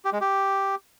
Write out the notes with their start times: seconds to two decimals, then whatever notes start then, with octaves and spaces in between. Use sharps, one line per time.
0.05 G4
0.13 G#3
0.21 G4